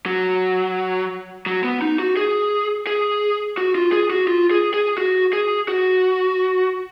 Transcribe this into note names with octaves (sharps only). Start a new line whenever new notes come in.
F#3
F#3
B3
D#4
F#4
G#4
G#4
F#4
F4
G#4
F#4
F4
G#4
G#4
F#4
G#4
F#4